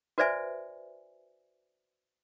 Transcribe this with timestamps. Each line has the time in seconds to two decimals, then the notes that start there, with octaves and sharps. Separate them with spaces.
0.18 F#4 B4 C5 D5 E5 G#5